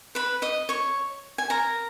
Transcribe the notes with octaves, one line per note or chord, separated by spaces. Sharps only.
B4 B5
D#5 D#6
C#5 C#6
G#5
A#4 A#5